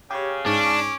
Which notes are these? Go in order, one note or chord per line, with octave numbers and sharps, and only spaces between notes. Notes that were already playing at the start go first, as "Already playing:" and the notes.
C#3 G4 C#5
G#2 C#4 D4 D6